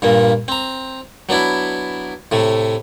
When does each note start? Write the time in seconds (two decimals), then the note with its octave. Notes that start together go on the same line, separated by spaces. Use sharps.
0.02 G2 A#2 A#3
0.48 C4 A#5
1.29 F#3 B3 D4 E4
2.32 A2 C3 A3